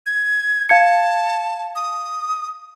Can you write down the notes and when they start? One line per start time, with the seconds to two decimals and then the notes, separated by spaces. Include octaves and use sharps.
0.06 G#6
0.69 F5 A5 G#6 C#7
1.75 D#6